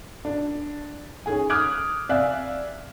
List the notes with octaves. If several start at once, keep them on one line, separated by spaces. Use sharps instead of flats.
D4
C#4 D#4 G#4 G#5
D6 D#6 F6 F#6 G#6 D7
C3 D5 E5 F5 G#5 F#6